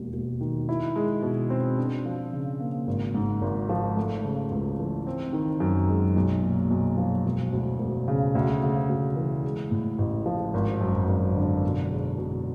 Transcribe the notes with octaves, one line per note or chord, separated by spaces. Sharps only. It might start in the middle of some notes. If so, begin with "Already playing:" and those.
Already playing: E1 D#2
E1
D#3
E4
G#3
B2
C4
D4
F3
C#3
A#3
G#1
G#2
G#1
F3
A3
C#3
C#2
E3
C4
D#3
F#2
G#3
B1
A#2
B1
F3
E1
D2
E1
C#3
D2
C#3
D2
E3
G#3
A2
A1
F3
G#1
F#2
G#1
D3
B2
G#3
B2